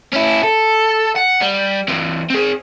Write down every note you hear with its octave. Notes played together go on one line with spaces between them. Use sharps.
C#4 E4
A4
F#5
G3
E3 C4
C4 G#4